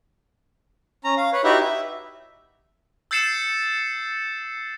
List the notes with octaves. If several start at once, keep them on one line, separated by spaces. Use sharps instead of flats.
C#4 A#5
F5
B4 C#5
D#4 E4 F#4 G4 B4 E5
E5
E6 G6 A6 C7 C#7 E7